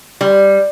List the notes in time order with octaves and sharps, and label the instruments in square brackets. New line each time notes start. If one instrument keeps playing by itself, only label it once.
[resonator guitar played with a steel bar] G3